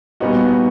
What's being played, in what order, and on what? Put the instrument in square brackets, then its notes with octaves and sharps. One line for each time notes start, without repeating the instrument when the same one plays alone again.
[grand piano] A#2 G3 B3 D#4 F#4